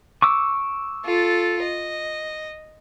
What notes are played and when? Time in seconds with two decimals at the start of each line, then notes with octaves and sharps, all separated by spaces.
0.22 C#6 D6 E6
1.05 F4 A4
1.62 D#5